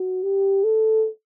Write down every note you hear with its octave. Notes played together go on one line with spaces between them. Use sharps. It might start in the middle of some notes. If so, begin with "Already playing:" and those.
Already playing: F#4
G4
A4